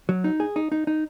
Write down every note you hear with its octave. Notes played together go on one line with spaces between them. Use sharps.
F#3
D#4
G#4
D#4
D#4
D#4